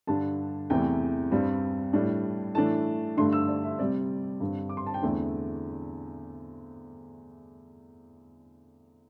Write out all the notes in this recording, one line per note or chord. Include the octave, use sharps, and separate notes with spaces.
G2 D3 G3 D4 A5
E2 C3 E3 A3 G5
G2 G3 C4
A2 G3 D4
A2 E3 A3 D4 A5
G2 D3 A3 D4 C6
E6
D5
E5
C3 G3 C4 D5
G2 D3 C4
D6
C6
A5
G5
E2 D3 A3 C4 E5